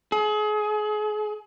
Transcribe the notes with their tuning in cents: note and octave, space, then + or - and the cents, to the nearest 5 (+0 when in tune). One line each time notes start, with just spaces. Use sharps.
G#4 +35